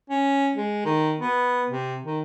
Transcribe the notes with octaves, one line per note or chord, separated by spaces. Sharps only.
C#4
G#3
D#3
B3
C3
D#3